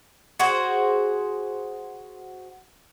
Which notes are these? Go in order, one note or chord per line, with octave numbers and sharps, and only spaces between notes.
F#4 G#4 C5